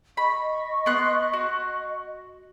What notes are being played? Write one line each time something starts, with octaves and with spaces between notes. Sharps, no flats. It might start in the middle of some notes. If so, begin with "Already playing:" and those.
D#5 B5 C#6
B3 C6 F#6
F#4